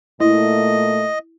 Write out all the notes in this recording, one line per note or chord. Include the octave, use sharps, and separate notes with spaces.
A#2 A3 E4 D#5